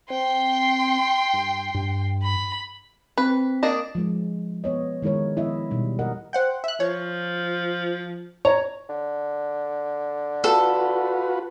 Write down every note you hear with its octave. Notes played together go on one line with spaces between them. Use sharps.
C4 G5 C6
G2
G2
B5
C4 B4
A#3 D4 D#5
F3 G#3
B3 C#5 D#5
D#3 G#3 E4 A#4 C#5
F3 B3 E4 D#5 E5
B2 G3 D#4
A#4 D#5 F#5
C5 F#5 G5
E5 F#6
F3 C#5
C#5 A#5
D3
F4 F#4 A4 B4